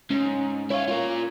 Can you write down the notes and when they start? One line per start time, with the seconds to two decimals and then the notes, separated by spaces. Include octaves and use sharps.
0.10 G#2 C#4
0.70 E4 C#5 F5
0.88 F4 A#4